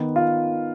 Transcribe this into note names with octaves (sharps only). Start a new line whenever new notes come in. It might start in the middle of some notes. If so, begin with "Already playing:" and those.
Already playing: D#3 B3
F4